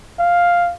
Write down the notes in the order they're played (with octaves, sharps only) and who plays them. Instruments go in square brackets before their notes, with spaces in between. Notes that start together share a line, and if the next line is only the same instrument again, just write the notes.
[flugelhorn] F5